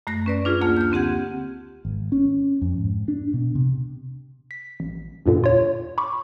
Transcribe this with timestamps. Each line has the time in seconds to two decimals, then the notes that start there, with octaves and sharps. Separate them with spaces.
0.07 F#2 A3 F#6 A#6
0.26 C#4 B4 D5
0.45 D4 F4 G#4
0.61 D2 A#3 F4 A5 F6
0.77 F6 G6
0.92 D3 C4 G4 F#5 G#6
1.85 G#1
2.12 C#4
2.61 F2
2.78 G#2
3.08 D4
3.34 B2
3.55 C3
4.51 B6
4.80 A1
5.26 E2 G2 A#2 D3
5.44 F4 C#5
5.98 B5 C#6 D6